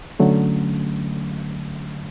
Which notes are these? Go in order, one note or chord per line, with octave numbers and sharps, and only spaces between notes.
D3 F#3 A3 C#4